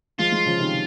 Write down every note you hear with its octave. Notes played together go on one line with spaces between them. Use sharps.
F3 G#3 F4
F3 G#3
C#3 F3
C3 D#3